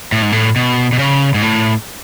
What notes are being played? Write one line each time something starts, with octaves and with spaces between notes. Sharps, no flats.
A2
G#2
A2
B2
B2
C#3
G#2
A2